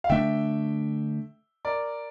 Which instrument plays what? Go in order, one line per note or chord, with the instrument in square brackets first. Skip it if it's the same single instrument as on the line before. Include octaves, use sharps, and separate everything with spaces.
[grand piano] F5
[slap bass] D3 A3 D4 [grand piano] E5 G5
[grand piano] A#4 D5